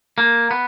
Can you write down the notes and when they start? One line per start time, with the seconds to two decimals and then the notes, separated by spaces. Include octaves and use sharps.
0.18 A#3
0.51 B3